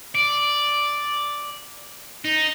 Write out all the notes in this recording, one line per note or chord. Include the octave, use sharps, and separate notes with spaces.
D5
D#4